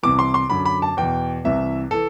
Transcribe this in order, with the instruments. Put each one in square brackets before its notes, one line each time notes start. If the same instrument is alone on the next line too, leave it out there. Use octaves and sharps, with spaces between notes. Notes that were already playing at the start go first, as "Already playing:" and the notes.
[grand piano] C2 C3 E3 D6
C6
C6
F#2 D3 B5
B5
A5
E2 B2 G5
C2 C3 E3 E5
E3 A4